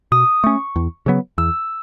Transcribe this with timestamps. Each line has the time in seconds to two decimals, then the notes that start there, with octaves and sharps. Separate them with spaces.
0.12 B2 D#6
0.44 A3 C#4 C#6
0.76 E2
1.06 C#3 F#3 B3
1.38 E2 E6